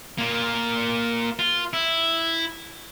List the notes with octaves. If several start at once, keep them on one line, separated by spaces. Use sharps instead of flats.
A#3 F4
F4
E4